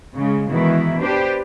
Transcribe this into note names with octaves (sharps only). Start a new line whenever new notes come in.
C#3 G#3
B2 D#3 E3 G#3 E4
D4 G4 B4 C5